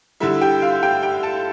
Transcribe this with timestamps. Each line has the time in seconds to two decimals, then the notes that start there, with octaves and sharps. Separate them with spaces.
0.20 D3 G3 E4 E5
0.41 G4 G5
0.62 F4 F5
0.83 G4 G5
1.03 G4 G5
1.23 A4 A5